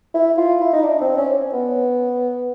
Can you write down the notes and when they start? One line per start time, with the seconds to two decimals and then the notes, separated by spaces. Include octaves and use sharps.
0.14 E4
0.37 F4
0.60 E4
0.73 D#4
0.83 D4
1.01 C4
1.17 C#4
1.53 B3